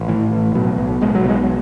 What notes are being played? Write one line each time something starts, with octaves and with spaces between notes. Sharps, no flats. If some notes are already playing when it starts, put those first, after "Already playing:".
Already playing: A1
A2 E3
A1
B2 F#3
B1
B2 G#3
F#3
B1 G#3